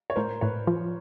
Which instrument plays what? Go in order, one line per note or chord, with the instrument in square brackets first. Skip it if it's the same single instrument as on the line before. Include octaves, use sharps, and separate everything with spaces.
[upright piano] C#5
[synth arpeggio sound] A2 [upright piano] A#4 C5
[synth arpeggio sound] A2 [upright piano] B4 C#5
[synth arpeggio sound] F3